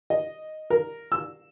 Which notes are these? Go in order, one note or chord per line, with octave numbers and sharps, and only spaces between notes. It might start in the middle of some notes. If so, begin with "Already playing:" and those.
D#5
A#4
E6